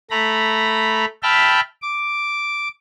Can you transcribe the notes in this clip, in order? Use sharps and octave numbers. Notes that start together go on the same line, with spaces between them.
A3 A#5 B5
E5 G5 A5 B5 F6
D6